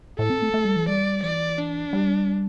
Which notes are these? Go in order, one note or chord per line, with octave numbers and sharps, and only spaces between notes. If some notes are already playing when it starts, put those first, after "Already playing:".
A2 A4
C4
A3
A3
G3
E3
G3 D5
E3 D5
D4
G3